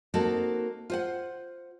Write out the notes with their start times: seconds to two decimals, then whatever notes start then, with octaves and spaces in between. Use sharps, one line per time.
0.14 A#3 C4 D#4 F#4 A4
0.90 F4 C5 F#5